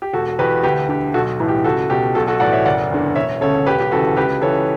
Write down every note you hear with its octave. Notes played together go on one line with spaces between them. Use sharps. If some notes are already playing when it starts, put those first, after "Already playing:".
G4
E1 F#4 A4
E2 B2 G4 B4
D2 G4 B4
D3 G4
B1 F#4 A4
A2 E3
G4
C#2 F#4 A4
B2 G4
B1 F#4 A4
F#4 A4
A2 E3 D5 F#5
C#5 E5
F#1 D5 F#5
E2 D3
E1 C#5 E5
D2 C#3 A4 C#5
E1 G4 B4
G4
D2 C#3 E3 F#4 A4
C#2 G4 B4
C#3 E3 A4 C#5